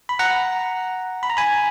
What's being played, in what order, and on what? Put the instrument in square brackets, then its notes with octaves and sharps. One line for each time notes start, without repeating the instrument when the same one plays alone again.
[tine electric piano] B5
F#5 A#5
B5
A#5
G#5 B5